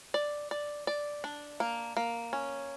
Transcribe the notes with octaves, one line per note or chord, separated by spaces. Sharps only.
D5
D5
D5
D4
A#3
A#3
C#4